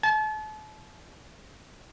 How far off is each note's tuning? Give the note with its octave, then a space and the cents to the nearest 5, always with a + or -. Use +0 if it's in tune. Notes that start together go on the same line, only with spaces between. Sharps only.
A5 -40